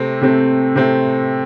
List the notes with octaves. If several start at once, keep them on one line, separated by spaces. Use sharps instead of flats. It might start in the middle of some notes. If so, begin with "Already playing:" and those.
Already playing: C3 A3 C4
C3 A3 C4
C3 A3 C4